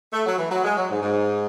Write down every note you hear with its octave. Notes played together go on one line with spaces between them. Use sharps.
A3
F#3
E3
F#3
G#3
F#3
G#2
G#2